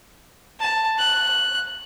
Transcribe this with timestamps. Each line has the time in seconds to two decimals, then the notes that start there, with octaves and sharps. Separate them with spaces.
0.60 A5
0.98 F#6